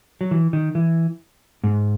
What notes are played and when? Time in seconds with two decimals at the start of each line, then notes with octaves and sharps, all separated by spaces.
0.21 F#3
0.31 E3
0.53 D#3
0.75 E3
1.64 G#2